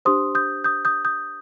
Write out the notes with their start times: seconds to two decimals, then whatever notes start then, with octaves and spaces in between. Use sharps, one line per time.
0.05 D4 G4 C5 C6 D#6
0.35 D#6 G6
0.64 D#6 G6
0.85 D#6 G6
1.05 D#6 G6